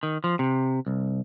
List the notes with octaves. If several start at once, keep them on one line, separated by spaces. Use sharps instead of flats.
D#3
F3
C3
C2